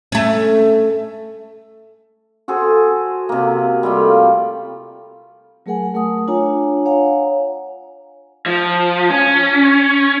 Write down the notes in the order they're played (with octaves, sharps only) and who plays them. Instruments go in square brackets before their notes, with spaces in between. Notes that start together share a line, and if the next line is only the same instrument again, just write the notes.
[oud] A3 C#4
[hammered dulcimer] F#4 G#4 A4 C5
C3 A#3
G3 A3 F4 G5
[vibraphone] F#3 A3 G#4 A#4 F#5 G#5
A3 A#4 F#5 D#6
D4 F4 C#5 G#5 A#5
C#5 F5 F#5 G#5 A#5
[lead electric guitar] F3
C#4